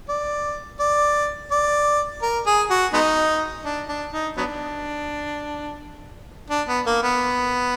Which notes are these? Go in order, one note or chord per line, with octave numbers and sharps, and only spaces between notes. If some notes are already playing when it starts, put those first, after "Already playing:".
D5
D5
D5
A#4
G#4
F#4
G#3 B3 D#4
D4
D4
D#4
F#3 B3 D4
D4
B3
A#3
B3